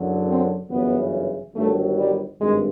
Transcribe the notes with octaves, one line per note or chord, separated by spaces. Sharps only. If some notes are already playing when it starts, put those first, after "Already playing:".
Already playing: F#1 F#2 D3 F#3
C4
G1 F#2 C#3 E3 B3
G1 G2 D#3 F#3 A3
G3
G#1 G2 G#3